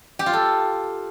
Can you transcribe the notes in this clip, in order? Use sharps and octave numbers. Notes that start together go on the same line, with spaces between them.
G4
F4
A4